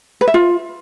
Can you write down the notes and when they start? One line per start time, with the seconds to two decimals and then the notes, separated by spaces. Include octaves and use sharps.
0.21 B4
0.28 E5
0.34 F4